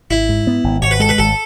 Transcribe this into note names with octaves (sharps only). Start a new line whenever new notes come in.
G#1 E4
G#2
B3
G#1
G#1 C#5
B4
G#3 A4
B4
G#1 A4